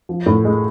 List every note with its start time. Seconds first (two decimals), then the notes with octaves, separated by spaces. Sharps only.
0.09 F3
0.26 A2
0.45 G#3